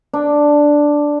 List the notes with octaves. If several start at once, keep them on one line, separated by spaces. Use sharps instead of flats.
D4